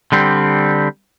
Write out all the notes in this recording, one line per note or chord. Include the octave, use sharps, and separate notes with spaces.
D3 G3 C4